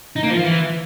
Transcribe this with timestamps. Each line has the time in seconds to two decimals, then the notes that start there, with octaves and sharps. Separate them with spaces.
0.16 D#4
0.23 A#3
0.30 F3
0.37 F4
0.44 E3